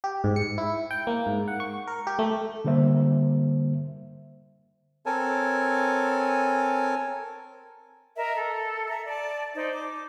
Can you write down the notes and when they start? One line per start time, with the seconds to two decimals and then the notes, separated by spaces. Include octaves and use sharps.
0.04 G4
0.24 G#2
0.36 C#7
0.58 E4
0.91 G5
1.07 A#3
1.26 G#2
1.48 F#5
1.60 C#6
1.88 A#4
2.07 G4
2.19 A3
2.65 D3 G3 A#3 C5 E5
5.06 C4 A4 A#4 C#5 G#5 A5
8.16 A#4 D#5 E5
8.36 A4
8.88 E5 A#5
9.05 D5 A5
9.55 D#4 C5 D5
9.73 D6